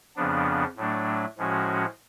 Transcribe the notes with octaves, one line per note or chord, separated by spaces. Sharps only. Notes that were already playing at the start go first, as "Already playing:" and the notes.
F2 C#3 F3 B3 D4
A2 F#3 A3 D4
A2 F3 G#3 C#4 F#4